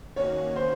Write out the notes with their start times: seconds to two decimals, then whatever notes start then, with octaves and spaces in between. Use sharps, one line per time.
0.16 D#3 A#3 C#4 F#4 C#5
0.56 C5